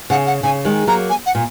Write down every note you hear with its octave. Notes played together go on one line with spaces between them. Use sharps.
C#3 F#5
F#5
C#3 G#5
D#3 G#3
F#3 A#3 A#5
G#5
F#5
A#2